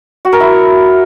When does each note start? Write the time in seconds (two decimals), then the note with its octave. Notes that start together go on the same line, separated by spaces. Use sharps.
0.25 F#4
0.33 A#4
0.40 E4